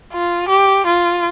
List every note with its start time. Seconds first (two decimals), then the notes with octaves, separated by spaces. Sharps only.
0.13 F4
0.49 G4
0.87 F4